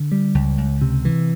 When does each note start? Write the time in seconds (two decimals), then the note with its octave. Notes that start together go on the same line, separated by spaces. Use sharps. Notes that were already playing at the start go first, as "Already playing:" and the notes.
Already playing: D3
0.12 G3
0.35 C#2
0.58 C#2
0.81 C3
1.05 E3